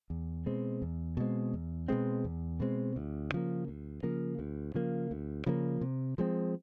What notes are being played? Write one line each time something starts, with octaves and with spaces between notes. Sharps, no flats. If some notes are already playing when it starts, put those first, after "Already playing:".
E2
B2 G#3 C4
E2
B2 G#3 C4
E2
B2 G#3 C4
E2
B2 G#3 C4
D2
C#3 F3 A#3
D2
C#3 F3 A#3
D2
C#3 F3 A#3
D2
C#3 F3 A#3
C3
F3 G#3 C4